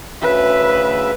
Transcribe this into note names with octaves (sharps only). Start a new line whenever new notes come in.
D2 C#3 B4 E5